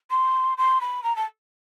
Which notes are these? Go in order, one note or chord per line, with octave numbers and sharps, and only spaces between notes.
C6
C6
B5
A#5
A5